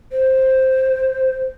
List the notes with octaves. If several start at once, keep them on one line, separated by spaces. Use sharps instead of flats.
C5